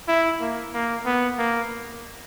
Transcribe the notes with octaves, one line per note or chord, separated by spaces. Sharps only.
E4
A#3
A#3
B3
A#3